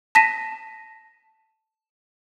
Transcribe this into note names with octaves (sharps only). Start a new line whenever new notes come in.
A5 A#6 B6 D#7